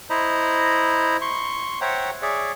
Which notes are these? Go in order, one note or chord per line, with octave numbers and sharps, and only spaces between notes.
E4 C5 D#5 A#5 B5
C6 C#6
C5 C#5 E5 F#5 G5 A#5
G#4 C#5 D5 E5